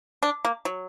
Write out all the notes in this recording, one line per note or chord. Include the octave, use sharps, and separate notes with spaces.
D4
A#3
F#3